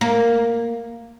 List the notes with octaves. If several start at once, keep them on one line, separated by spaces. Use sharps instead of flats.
A#3